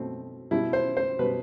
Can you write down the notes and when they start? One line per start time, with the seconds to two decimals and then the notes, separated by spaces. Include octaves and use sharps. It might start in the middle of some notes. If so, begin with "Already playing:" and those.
Already playing: B2 A3 C4
0.51 B2 G3 E4
0.73 C5
0.97 C5
1.19 B2 G3 B4